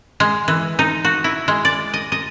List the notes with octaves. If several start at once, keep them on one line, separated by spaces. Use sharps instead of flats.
G#3
E3
D#4
F#4
E4
G#3
D5
D#5
D#5